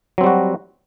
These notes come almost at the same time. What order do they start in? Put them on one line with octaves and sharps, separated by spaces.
F#3 C4 G3 F#4